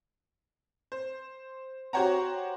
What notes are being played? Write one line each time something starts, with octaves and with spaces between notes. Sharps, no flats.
C5
F#4 G4 C5 C#5 F#5 A#5